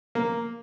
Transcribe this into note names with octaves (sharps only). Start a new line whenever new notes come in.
A#3